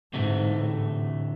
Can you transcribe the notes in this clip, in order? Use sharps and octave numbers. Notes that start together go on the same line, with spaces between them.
D2 G#2 C3 E3 A3
A2